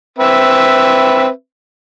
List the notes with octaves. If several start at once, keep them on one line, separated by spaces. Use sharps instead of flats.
C4 B4 E5